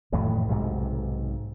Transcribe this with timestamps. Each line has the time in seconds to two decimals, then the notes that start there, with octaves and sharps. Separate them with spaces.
0.12 F2 A2 D#3 E3
0.49 B1 G#2 C3